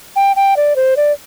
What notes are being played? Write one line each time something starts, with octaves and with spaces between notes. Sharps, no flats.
G5
G5
D5
C5
D5